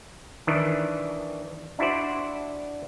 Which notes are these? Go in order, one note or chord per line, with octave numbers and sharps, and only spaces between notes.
D#3 E3 D4
D4 E4 F#4 C5 D5